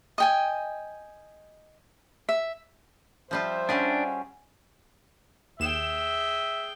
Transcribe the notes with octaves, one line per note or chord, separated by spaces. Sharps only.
D#5 G5 G#5
E5
F3 G3 F4 C5 E5
G3 C#4 D4 G#4 F#5 G#5
D#2 G#4 E5 G5 E7